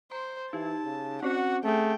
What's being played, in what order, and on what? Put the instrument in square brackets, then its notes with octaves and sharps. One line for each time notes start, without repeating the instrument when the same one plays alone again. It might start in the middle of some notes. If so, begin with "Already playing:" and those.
[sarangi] C5 [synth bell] A#5 C6
[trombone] E3 [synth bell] D#4 G4 [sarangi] A5
[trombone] C#3
[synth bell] C4 C#4 C5 [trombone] F#4 [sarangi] F#5
[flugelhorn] A3 [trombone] G#4 [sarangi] G5